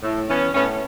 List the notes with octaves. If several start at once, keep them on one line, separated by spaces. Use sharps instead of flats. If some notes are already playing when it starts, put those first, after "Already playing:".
A2
E3 B3 C#4
A2 B3 C#4